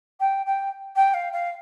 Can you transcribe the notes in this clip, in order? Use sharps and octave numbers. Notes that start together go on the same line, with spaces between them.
G5
G5
G5
F5
F5